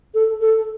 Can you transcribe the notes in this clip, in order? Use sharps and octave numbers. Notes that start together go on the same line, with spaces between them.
A4
A4